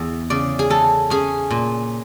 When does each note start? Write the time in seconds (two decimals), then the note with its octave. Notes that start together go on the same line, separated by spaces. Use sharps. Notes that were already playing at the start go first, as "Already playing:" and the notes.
Already playing: E2
0.30 C#3 D5
0.59 G#4
0.70 E3 A4
1.10 C#4 G#4
1.50 A#2